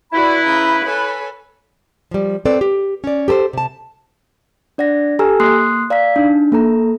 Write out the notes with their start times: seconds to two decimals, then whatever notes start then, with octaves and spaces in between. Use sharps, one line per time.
0.13 E4 F#4 B4 D5 B5
0.45 C#3 A#5 G6
0.83 A4 B4 C#5 G#5
2.11 F3 G3
2.45 C4 A4 B4 D5
2.61 G4
3.04 C#4 D5
3.28 G4 A4 B4 C5
3.53 C3 A5
4.78 D4 D5 F#5 A#6
5.19 G4 A4 G#5 A#5 E6 F6
5.40 A#3 C6 D#6 F#6 C7
5.90 D5 F5 A#5 E6 B6
6.16 D4 D#4
6.52 A#3 A4 A#5